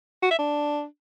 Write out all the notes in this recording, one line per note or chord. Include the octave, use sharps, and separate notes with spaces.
F#4
E5
D4